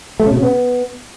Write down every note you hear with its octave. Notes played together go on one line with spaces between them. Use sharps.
A3
C#3
B2
C#3
B3